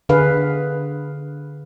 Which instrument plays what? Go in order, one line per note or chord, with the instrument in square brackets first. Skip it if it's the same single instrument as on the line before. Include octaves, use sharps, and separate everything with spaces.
[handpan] D3 G#4 B4 F5